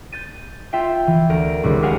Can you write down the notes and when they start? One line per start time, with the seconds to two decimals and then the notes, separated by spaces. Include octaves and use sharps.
0.12 G6 A6 D#7
0.73 F4 E5 F5 G5
1.07 E3
1.29 D2 A#4 D7
1.63 D#1 C#2 D#3
1.83 G4 G#4 A#4 F5 F#5 G#5